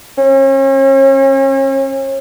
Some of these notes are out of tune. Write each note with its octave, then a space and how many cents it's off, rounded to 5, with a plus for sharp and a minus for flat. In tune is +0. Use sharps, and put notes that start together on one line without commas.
C#4 -40